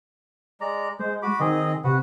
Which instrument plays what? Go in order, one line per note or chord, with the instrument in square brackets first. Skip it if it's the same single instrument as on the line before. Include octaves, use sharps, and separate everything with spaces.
[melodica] G#3 D5 A#5
[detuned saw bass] G#3 [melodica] C5
[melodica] F#4 B5 D6
[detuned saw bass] D#3 [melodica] C4 G#4 D#5
[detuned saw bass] C3 [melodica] F#4 B4 F#5